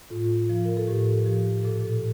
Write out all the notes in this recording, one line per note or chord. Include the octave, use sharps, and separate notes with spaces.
A2 F4
F3
A#4
A4
A2 G4
F3 G4
A#2 A4